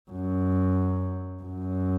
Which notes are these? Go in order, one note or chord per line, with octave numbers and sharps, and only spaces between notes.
F#2
F#2